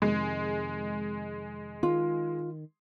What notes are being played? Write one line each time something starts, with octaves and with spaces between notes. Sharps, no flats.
F2 C3 D#3 G#3
D#3 F4